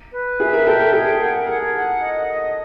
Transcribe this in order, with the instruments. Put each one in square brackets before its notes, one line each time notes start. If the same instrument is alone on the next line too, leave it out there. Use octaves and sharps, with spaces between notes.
[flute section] B4
[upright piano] G#4 [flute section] E5
[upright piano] A#4
[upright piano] A4 [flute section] G5
[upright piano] A#4
[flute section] G#4 [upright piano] A4
[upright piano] A#4 [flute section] F#5
[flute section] G#4 [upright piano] A#4
[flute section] F#5
D#5
D#5